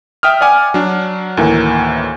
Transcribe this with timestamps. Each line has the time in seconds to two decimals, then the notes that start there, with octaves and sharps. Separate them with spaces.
0.23 E5 G5 D#6 F6
0.41 D5 F#5 G#5 D6
0.74 F#3 D4
1.37 D2 A2 D#3 E3 A#3